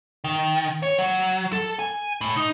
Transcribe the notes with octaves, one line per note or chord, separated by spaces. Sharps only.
D#3
C#5
F#3
A4
G#5
A2
D#4